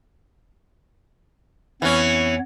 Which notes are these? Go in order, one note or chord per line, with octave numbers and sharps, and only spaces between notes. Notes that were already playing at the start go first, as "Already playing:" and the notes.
F2 E3 B3 C#4 C#5